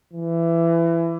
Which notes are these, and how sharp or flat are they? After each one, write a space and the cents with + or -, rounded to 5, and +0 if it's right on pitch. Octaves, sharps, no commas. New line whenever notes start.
E3 +20